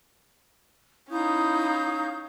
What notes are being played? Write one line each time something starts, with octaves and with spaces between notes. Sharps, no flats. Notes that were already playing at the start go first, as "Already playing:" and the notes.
C#4 D#4 E4 F5 D#6 G6